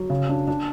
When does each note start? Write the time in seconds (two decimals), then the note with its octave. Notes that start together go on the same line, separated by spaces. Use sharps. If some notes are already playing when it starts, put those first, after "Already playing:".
Already playing: F#3
0.10 C#3
0.29 D4
0.48 D4